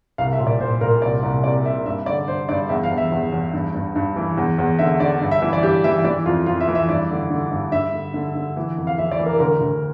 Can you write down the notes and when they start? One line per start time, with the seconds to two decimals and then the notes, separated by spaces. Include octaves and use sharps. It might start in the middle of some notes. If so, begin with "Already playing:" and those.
0.18 C2 F5
0.33 E5
0.39 A#2
0.47 D5
0.60 A#2 C5
0.81 A#2 A#4
1.02 C2 D5
1.23 C2
1.44 C3 D5
1.65 C3 E5
1.86 G2 E5
2.06 D3 D5
2.28 G2 C5
2.49 G2 D5
2.69 E2 E5
2.84 F5
2.91 E2
2.98 E5
3.12 E2
3.32 E2
3.53 G2
3.74 G2
3.96 G2
4.16 E3
4.37 E2
4.58 E2
4.79 D3 E5
5.00 D3 D5
5.21 G2
5.31 E5
5.42 E3 E5
5.53 D5
5.63 G2 G4
5.84 E3 E5
6.05 E3 D5
6.26 F2 F4
6.46 F2 F4
6.61 E5
6.68 E3
6.75 E5
6.89 G2 D5
7.10 D3
7.30 D3
7.52 G2
7.72 G2 E5
7.93 D3
8.14 D3
8.35 D3
8.57 E3
8.77 F2
8.87 F5
8.98 E3 E5
9.11 D5
9.19 E3
9.26 A#4
9.40 D2 A#4
9.61 D2